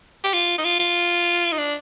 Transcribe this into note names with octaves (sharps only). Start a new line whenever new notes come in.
G4
F4
D#4
F4
F4
D#4
D4